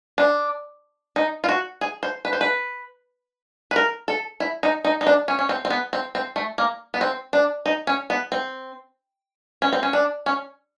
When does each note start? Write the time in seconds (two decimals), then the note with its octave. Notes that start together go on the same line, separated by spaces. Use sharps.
0.18 D4
1.16 D#4
1.44 F4
1.49 F#4
1.81 G#4
2.03 C5
2.25 B4
2.33 C5
2.41 B4
3.71 B4
3.76 A#4
4.08 A4
4.40 E4
4.63 D#4
4.85 D#4
5.01 D#4
5.07 D4
5.28 C#4
5.39 C#4
5.49 C4
5.65 C4
5.70 B3
5.93 C4
6.15 C4
6.36 A3
6.58 A#3
6.94 B3
7.01 C4
7.33 D4
7.66 D#4
7.87 C#4
8.10 B3
8.32 C4
9.62 C#4
9.73 C4
9.83 C#4
9.93 D4
10.26 C#4